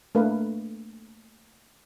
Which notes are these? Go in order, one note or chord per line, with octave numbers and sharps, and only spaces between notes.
A3 A#3 D4 A#4 B4 F5